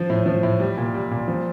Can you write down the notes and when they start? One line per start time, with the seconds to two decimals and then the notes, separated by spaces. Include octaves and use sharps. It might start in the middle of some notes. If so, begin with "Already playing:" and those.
Already playing: F3
0.10 A2
0.26 F3
0.43 A2
0.60 G3
0.77 A#2
0.94 G3
1.11 A#2
1.28 F3